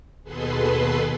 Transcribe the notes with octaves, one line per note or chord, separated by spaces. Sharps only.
D#2 B2 G#4 A4 B4 C6